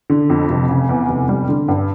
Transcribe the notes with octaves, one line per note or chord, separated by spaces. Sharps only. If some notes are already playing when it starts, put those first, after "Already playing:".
D3
F2
F1
C#3
E2
F1
G3
D3
G2